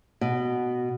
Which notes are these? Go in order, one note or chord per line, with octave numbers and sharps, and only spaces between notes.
B2